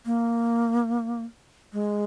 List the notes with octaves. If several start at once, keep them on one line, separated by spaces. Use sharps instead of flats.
A#3
G#3